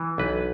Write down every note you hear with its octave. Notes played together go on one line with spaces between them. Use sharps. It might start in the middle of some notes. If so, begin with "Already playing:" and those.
Already playing: E3
B1 B4